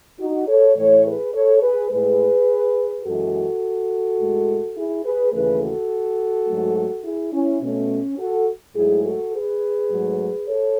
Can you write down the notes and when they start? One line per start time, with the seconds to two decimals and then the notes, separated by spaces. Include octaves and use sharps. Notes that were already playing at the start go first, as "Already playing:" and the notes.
0.20 D#4 F#4
0.48 A4 C#5
0.77 A2 E3 A3 A4 C#5
1.05 G#4 B4
1.34 A4 C#5
1.62 G#4 B4
1.91 A2 G#3 G#4 B4
3.05 F#2 E3 G#3 F#4 A4
4.19 A2 G#3
4.76 E4 G#4
5.05 G#4 B4
5.33 D#2 C#3 E3 A3 G#4 B4
5.62 F#4 A4
6.48 G#2 F#3 A3
7.04 E4 G#4
7.33 C#4 E4
7.62 B2 A3 C#4
8.19 F#4 A4
8.76 G#2 F#3 A3 E4 G#4
9.05 F#4 A4
9.33 G#4 B4
9.90 G#2 F#3 A3
10.47 A4 C#5